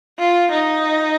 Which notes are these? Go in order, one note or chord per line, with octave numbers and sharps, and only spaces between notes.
F4
D#4